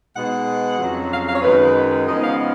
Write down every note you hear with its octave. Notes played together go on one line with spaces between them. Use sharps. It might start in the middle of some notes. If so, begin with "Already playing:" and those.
B2 G#3 D#4 F#5
F2 C#3 F#3
F5
F5
C#5
F#2 D#3 G#3 B4
C#3 F3 G#3 B3 D#4 D#5
F5
D#5